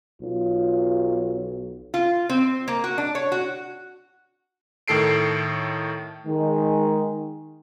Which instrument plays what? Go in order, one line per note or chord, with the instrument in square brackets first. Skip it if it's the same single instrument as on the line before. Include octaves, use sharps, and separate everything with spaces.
[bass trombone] B1 [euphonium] F4
[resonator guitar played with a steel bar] F4
C4
A#3
F#4
D4
C#5
F#4
[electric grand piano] A2 D#3 A4 C7 D7
[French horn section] D#3 G#3